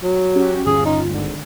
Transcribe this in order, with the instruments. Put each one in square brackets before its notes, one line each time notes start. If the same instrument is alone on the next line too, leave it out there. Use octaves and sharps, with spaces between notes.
[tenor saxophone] F#3
[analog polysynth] C#4 F#4 G4
[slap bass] G1 D#2 [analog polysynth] C#4 F4 [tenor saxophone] G#4
[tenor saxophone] D#4
[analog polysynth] G#1 G#2 [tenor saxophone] D3